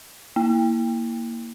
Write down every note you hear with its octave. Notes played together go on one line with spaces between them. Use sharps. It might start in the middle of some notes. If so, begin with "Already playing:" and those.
A#3